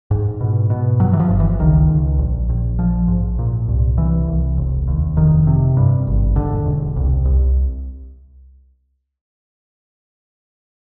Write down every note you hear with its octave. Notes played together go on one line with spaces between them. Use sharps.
G#2
B2
B2
G2 F#3
E3
F3
G1
E3
C#2 D#3
C#2
A#1
A#1
A#1 F3
G#2
A#2
C2
C2 E3
C2
E1
D#2
F1 D#3
C3
G2
G#1
E1 D3
E1
C2
C2